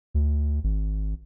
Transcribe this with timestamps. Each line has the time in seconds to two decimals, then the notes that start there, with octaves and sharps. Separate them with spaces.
0.15 D2
0.64 G#1